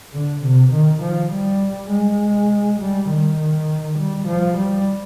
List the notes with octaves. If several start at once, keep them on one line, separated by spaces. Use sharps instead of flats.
D3
C3
D#3
F3
G3
G#3
G3
D#3
G3
F3
G3